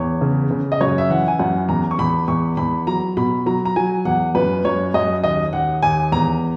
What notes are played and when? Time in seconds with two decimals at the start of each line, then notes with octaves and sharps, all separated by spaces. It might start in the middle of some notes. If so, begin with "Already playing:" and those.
Already playing: E2 C#5
0.21 C#3
0.51 C#3
0.72 D#5
0.81 F#2 C#5
0.98 E5
1.10 E3 F#5
1.28 G#5
1.39 F#2 F#5
1.69 E2 A#5
1.91 C#6
1.99 E2 B5
2.28 E2 C#6
2.57 E2 B5
2.87 F#3 A#5
3.17 B2 B5
3.46 F#3 A#5
3.65 A#5
3.76 F#3 G#5
4.05 E2 F#5
4.35 F#2 B4
4.65 F#2 C#5
4.94 F#2 D#5
5.24 D#2 D#5
5.53 D#2 F#5
5.82 D#2 G#5
6.12 E2 A#5